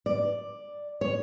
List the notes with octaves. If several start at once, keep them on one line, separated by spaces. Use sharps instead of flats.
D5
C#5